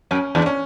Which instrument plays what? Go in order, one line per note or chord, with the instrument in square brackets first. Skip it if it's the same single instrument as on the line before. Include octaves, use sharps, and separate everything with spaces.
[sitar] F#2 [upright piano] C#4
[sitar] E2 [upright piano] D4
[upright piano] C#4